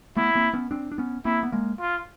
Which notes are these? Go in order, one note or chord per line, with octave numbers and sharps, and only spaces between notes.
A3 B3 E4
A#3 C4
B3 C#4
C4 D4
D4
B3 C#4
A#3 C4 E4
B3
G#3 A#3
F4